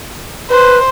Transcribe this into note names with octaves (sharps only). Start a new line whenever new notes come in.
B4 C5